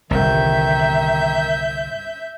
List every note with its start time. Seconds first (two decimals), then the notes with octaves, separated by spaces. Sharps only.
0.11 G1 C2 D#3 E5 G6